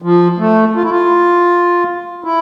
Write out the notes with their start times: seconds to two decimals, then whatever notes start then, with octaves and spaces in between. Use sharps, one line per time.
0.02 F3
0.39 A3
0.76 F4
0.83 E4
0.90 F4
2.24 E4